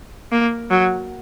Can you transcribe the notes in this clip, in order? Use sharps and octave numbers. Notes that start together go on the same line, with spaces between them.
A#3
F#3